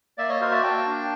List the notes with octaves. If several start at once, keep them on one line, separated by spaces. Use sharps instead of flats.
A#3 D5 E5
C#5 D#5
F#4 A#4 C5
D5 E5
A#3 G5 A5
D4